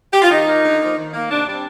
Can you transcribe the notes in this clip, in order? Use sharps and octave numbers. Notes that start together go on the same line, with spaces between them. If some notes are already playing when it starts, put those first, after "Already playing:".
G4
F4
D#3 D#4
A#3
D3
F3 A#3
D#3
A#3
C3 D4
G3 C4 D4